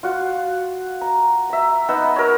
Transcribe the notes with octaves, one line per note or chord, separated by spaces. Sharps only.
F4 F#4 F#5
A#5
E5 A#5
B3 D#4 F#5 E6
A#4 C#5